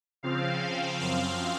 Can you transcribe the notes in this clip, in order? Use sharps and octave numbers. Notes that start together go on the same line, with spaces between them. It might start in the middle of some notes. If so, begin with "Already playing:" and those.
C#3 F3 C4 F5
F#2 F3 C4 F5